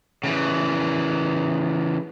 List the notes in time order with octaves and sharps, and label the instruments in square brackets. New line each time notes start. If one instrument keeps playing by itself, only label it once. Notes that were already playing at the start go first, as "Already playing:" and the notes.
[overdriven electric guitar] C#3 E3